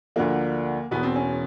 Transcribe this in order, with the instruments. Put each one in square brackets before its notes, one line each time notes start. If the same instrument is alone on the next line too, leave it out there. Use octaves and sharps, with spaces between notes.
[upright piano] D2 D3 F3 A#3
E1 E2 B2 B3
C4
C#4